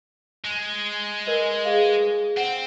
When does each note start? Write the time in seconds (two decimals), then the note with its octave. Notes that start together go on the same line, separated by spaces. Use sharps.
0.45 G#3
1.27 A#4 B4 D#5
1.65 G#4 F5
2.37 C4 F#5